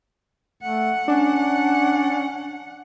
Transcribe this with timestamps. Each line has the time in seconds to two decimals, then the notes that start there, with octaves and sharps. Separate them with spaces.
0.63 A3 F#5
1.08 C#4 D4